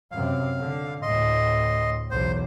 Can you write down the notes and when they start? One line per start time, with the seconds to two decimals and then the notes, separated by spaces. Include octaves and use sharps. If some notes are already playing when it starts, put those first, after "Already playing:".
0.11 F#2 C3 F5
0.59 D3
1.02 D2 A2 D#5 C6
2.11 B1 E2 C5